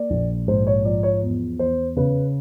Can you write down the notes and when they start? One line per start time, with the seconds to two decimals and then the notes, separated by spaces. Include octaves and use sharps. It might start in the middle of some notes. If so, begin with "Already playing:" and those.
Already playing: A#3 D5
0.10 A#1
0.48 G#2 C5
0.67 C#5
0.85 F3 D5
1.03 C#5
1.22 E2
1.59 E2 C5
1.96 C#3 B4